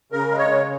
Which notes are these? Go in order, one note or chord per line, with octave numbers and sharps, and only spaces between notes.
C#3 A#4
G#3
C#5
C#3